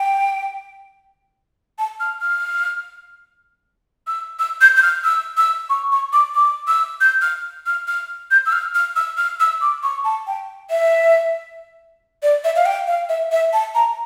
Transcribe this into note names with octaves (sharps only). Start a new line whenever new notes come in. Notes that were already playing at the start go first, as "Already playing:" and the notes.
Already playing: G5
A5
F6
F6
E6
E6
G6
G6
F6
E6
E6
C#6
C#6
D6
D6
E6
G6
F6
F6
F6
G6
E6
F6
F6
E6
F6
E6
D6
C#6
A5
G5
E5
D5
E5
F5
G5
F5
E5
E5
A5
A#5